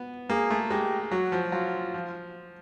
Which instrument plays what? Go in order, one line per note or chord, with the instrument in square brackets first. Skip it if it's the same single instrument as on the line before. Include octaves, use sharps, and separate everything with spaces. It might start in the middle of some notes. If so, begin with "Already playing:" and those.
Already playing: [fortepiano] B3
[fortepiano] A#3 [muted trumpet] G#4
[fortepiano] A3
[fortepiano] G#3 [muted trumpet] G4
[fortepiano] F#3 [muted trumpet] F#4
[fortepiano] F3
[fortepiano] F#3 [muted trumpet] F4
[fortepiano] F3